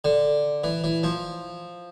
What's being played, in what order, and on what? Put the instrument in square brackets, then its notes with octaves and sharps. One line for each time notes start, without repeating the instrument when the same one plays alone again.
[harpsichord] D3
E3
E3
F3